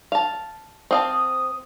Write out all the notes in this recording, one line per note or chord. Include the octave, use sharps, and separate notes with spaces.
F5 A5
C4 F5 A5 D#6